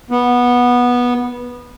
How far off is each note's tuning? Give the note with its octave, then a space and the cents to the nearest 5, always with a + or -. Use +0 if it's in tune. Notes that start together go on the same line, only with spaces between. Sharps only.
B3 -15